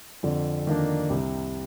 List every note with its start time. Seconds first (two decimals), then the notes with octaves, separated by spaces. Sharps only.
0.23 F2 D3
0.67 D#3 A#3 D4
1.10 C2 C3